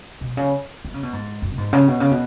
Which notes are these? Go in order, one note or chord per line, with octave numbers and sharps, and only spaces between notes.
B2
C#3
D#3
C#3
B2
G#2
F#2
B2
G#2
C#3
B2
C#3
B2